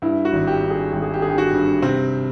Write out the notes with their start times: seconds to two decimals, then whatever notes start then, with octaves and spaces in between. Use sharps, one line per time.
0.02 G2 E4
0.25 F#4
0.32 G#1
0.47 G4
0.63 G2
0.70 G#4
0.93 G#1 G4
1.03 G#4
1.14 G4
1.22 D3 G#4
1.30 G4
1.38 F#4
1.52 G2
1.82 C3 C4